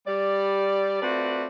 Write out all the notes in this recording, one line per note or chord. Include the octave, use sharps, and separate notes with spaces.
G3 D5
A3 C4 F4 F#4 B4 D5